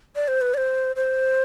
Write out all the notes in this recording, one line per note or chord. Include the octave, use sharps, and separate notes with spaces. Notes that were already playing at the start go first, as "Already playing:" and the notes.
D5
C5
B4
D5
C5
C5